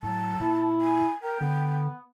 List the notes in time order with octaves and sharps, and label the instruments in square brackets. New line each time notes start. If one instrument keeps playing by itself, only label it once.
[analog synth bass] A2 [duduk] F#3 [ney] A5
[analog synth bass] A#2 [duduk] E4
[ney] G#5
[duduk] A#4 [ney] G5
[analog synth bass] D3 [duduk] B3